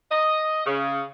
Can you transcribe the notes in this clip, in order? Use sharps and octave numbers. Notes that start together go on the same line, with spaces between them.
D#5
C#3